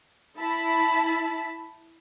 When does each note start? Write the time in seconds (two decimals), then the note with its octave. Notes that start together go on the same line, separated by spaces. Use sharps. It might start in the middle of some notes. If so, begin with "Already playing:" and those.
0.37 E4 A5 B5